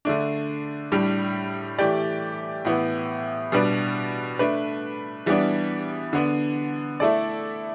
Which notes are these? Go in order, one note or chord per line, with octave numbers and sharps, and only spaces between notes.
D3 A3 D4
A2 G3 D4
E3 A3 G4 D5
A2 E3 B3 E4
B2 G3 D4 B4 D5
A3 D4 B4
E3 G3 B3 D4
D3 B3 D4
A3 E4 A4 D5